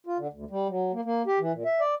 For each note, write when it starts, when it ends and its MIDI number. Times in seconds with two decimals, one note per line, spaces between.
0.07 0.18 65
0.18 0.28 50
0.33 0.45 38
0.51 0.68 55
0.69 0.92 54
0.93 1.01 58
1.05 1.22 58
1.27 1.39 67
1.40 1.52 52
1.52 1.64 46
1.65 1.80 76
1.80 1.95 74